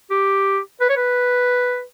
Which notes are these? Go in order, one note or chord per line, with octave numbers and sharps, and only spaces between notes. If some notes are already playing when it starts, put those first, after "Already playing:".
G4
B4
C#5
B4